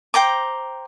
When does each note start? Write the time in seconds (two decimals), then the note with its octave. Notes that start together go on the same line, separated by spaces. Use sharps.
0.14 C5 G5 A#5 D6